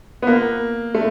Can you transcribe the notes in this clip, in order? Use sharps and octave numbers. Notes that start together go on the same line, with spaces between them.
B3
A#3
A3